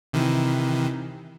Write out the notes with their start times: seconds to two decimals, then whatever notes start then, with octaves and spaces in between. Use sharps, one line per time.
0.13 C3 D#3 E3